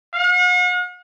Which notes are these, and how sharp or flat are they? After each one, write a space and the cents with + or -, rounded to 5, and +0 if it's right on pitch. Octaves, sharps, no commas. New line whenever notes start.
F#5 -45